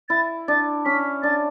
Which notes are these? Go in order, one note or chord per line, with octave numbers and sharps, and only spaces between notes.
E4 A6
D4 A6
C#4 B6
D4 A6